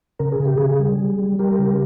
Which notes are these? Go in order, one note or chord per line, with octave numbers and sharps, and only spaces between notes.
C#3 A#4
G#4
C#3
G4
C#3 G#4
G3
G3
G3
G3 G4 A#4
C#3